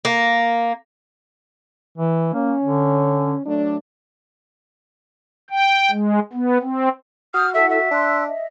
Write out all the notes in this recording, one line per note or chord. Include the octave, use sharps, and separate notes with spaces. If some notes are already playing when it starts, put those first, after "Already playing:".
A#3
E3
A#3 C#4
D3
F#3 A3 D4
G5
G#3
B3
C4
F#4 D#6 F6 G6
E4 A4 E5 F#5
E5
D4 C6 E6 F#6
D#5 E5